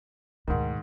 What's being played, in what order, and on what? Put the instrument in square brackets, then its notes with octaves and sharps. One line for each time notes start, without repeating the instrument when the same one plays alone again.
[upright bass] D2 B2 [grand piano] G#2 D#3